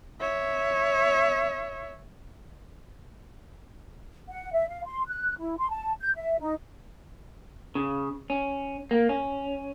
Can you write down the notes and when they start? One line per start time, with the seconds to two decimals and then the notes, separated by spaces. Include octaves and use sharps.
0.20 C#5 E5
4.29 F#5
4.53 E5
4.68 F5
4.86 C6
5.07 F#6
5.39 E4
5.59 C6
5.70 A5
6.00 G6
6.16 E5
6.41 D#4
7.75 C#3
8.30 C#4
8.91 A#3
9.09 C#4